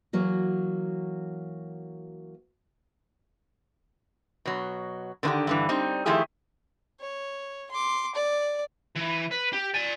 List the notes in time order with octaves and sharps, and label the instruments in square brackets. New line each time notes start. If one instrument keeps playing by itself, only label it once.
[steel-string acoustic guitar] E3 F#3 A#3 F#4
[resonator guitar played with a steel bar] B2 F#3
D3 D#3 C4 E4 F#4 G4
G2 D3 E3
G3 C4 D#4
D#3 F3 A3 E4 G4 G#4
[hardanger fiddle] C#5
C6 D6
D5
[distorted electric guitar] E3
B4
G4
D5 G#5